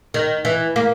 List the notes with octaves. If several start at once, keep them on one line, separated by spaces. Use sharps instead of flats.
D#3
E3
A#3